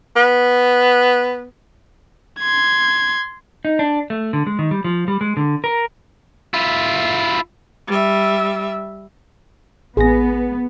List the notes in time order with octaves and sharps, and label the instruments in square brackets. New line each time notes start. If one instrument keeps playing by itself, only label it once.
[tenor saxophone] B3
[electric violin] C6 G#6
[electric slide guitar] D#4
D4
A3
D3
G#3
D#3
G3
F3
G3
G#3
D3
A#4
[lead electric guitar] E4 F4
[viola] G3 E5
[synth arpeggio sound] A1 A#6 [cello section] B3 [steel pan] G#4